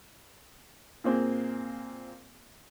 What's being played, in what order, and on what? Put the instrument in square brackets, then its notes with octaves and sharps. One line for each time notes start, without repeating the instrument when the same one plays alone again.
[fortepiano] A#2 A#3 C4 G#4